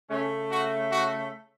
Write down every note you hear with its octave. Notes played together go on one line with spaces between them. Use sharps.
C#3 A3 C#4
F#4
F#4